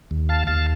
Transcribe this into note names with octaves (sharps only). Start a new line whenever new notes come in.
D#2
F5 A5
D#2 F5 A5